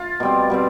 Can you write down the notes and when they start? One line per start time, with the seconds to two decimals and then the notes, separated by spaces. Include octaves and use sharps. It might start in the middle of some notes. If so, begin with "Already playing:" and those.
Already playing: F4
0.20 B2 G3 C4
0.50 B2 G3 C4